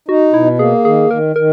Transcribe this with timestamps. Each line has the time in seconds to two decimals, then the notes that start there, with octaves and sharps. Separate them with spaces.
0.08 D#4 F#4
0.33 B2 E4
0.59 A#3 G#4
0.85 D#3 G#4
1.10 D#3 A#4
1.36 D#3 A#4